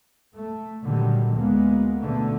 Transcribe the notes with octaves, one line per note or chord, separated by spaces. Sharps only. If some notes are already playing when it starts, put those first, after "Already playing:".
A3
A#2 D3 D#3 F#3 G3
D2 G#3 A#3 B3
B2 D3 A3